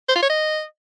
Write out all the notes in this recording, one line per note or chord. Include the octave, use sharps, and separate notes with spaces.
C5
F4
C#5
D#5